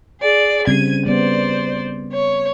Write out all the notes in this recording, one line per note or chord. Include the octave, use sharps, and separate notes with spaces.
G#4 D5
C#3 G3 C4 G#6 D#7
G3 B3 C5 D5
C#5